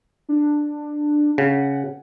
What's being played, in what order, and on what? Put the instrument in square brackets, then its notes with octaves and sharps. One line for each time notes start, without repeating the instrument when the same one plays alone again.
[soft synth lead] D4
[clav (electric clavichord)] C#3 [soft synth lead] F#5